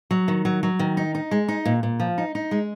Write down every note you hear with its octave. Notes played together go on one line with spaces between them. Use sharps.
F#3
D#3
F#3
F#3
D#3
D#4
D#4
G#3
D#4
A#2
A#2
F3
D#4
D#4
G#3